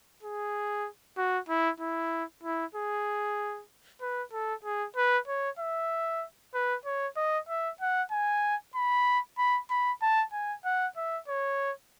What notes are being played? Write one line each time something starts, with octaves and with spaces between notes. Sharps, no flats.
G#4
F#4
E4
E4
E4
G#4
B4
A4
G#4
B4
C#5
E5
B4
C#5
D#5
E5
F#5
G#5
B5
B5
B5
A5
G#5
F#5
E5
C#5